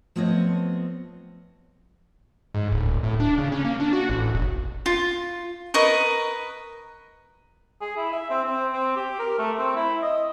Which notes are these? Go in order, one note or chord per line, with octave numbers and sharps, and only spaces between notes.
F3 A3 B3 C4 C#5 D#5
G#2
D1
A2
D4
C#3
C#4
A#3
D4
F#4
A1
E1
F4
A#4 B4 D#5 C#6
G#4
E4
E5
C4
C4
C4
G4
A#4
A3
C4
E4
D#5